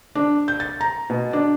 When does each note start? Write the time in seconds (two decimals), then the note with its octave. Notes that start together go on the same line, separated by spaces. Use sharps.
0.15 D4
0.48 G6
0.60 A6
0.81 A#5
1.10 B2
1.33 D4